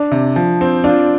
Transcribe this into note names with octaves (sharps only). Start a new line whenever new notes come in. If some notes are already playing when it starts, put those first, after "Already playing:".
Already playing: D4
C3
F3
C4
D4 F4